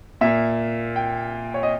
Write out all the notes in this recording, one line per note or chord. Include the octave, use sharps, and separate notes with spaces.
A#2 A#3 E5
G5
C#5
D#5